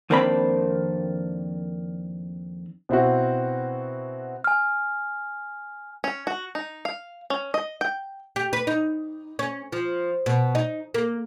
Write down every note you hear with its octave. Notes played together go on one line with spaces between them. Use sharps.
F2 D#3 A#3 C4 D4 B5
B2 C4 E4 F#4
G#5 F6
C#4
F#4
D#4
F5
C#4
D#5
G5
G4
B4
D#4
C#4
F3
B2
D#4
A#3